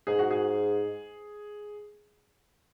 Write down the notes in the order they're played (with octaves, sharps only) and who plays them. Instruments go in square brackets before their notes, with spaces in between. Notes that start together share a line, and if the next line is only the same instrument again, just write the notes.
[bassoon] G#2 [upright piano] G#4
[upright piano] F#4
G#4